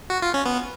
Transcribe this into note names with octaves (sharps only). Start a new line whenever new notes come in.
F#4
F4
C#4
B3